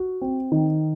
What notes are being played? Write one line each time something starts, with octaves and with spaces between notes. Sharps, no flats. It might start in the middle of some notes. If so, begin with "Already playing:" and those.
Already playing: F#4
C4
D#3